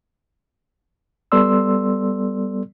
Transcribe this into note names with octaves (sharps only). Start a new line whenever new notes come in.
G3 B3 A4 D5 C6 E6